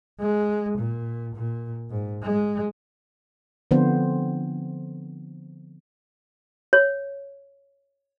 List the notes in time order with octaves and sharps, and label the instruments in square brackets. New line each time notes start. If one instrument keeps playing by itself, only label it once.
[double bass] G#3
A#2
A#2
G#2
G#3
[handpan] D3 F3 B3 C4 C5
[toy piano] C#5